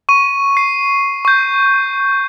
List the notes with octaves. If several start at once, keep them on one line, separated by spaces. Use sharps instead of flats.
C#6 D#7
C7
C#6 G6